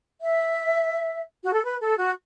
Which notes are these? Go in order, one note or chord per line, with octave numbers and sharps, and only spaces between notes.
E5
F#4
A4
B4
A4
F#4